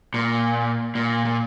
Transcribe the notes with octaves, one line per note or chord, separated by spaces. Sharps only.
A#2
A#2
A#2